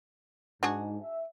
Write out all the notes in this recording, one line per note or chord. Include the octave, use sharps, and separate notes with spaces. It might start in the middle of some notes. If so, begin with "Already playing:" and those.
G#2 D4 F#4 G#4
E5